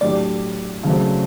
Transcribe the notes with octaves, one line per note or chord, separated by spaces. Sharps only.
A2 F#3 A3 D4 G4 D5
C#3 F#3 A3 C4